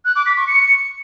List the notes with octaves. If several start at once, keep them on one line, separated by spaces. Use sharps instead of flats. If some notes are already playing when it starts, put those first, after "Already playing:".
F#6
D6
B6
C#6
C#7